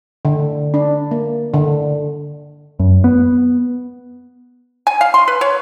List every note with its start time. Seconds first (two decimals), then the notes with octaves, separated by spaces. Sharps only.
0.25 D3
0.74 D4
1.11 A#3
1.54 D3
2.79 F#2
3.04 B3
4.87 G#5
5.01 F5
5.14 C6
5.28 B4
5.41 C#5